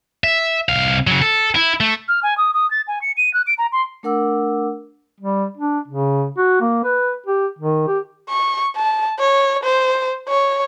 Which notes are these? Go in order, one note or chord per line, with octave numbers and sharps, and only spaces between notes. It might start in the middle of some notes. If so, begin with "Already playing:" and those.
E5
C2 F5
C#3 F#3
A4
E4
A3
F6
G#5
D#6
D#6
A6
G#5
C#7
D#7
F#6
D7
A#5
C6
A3 D4 A#4 F#5 D6 E6
G3
D4
C#3
F#4
A#3
B4
G4
D#3
G4
C#6
A5
C#5
C5
C#5